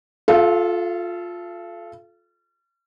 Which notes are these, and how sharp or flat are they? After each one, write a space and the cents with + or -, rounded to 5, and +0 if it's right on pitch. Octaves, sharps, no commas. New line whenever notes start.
F4 +15 A4 -20 F5 -40